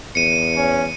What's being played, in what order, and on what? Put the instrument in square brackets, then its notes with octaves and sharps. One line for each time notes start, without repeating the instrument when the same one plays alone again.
[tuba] E2 [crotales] C#7 D#7
[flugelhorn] C#4